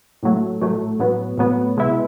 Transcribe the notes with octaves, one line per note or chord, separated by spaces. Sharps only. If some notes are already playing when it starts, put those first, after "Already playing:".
A#1 A2 F#3 A3
A#1 A2 F#3 A3
A2 F#3 B3
A2 F#3 B3
C2 B2 G#3 B3 E4